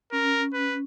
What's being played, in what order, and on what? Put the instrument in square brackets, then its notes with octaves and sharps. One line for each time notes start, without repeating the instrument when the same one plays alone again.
[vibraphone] C#4 [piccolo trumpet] A#4
[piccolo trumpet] B4